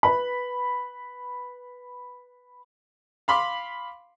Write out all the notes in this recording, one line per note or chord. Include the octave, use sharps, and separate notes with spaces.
B4 B5
F5 B5 C6 D6